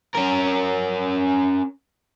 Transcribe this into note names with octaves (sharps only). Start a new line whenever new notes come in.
C#4 A#4